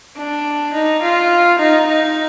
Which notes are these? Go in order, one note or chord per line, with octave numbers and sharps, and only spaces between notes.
D4
D#4
F4
D#4
D#4